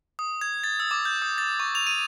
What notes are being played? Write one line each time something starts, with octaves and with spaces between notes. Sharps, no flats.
D#6
G#6
A6
E6
D6
G6
D#6
A6
C#6
F7
D#7